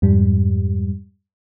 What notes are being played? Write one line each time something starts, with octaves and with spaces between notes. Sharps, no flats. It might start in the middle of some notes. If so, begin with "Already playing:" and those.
F2 G#2 G3